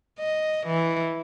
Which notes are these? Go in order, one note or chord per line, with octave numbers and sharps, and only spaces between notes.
D#5
E3